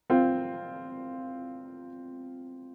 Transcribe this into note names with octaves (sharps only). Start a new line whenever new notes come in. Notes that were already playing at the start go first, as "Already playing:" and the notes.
C4 F4